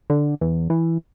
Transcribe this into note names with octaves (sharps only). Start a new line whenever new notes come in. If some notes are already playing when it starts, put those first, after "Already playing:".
D3
E2
E3